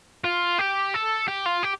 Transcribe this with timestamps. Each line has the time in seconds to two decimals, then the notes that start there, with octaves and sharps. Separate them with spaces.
0.24 F4
0.58 G4
0.94 A4
1.28 G4
1.46 F4
1.63 G4